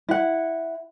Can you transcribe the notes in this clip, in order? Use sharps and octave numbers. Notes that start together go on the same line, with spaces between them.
E4 F#5